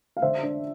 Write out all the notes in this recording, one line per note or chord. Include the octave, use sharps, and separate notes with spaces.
F5
D3 C5 E5
D4